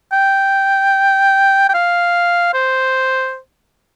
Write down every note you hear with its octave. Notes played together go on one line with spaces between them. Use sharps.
G5
G5
F5
C5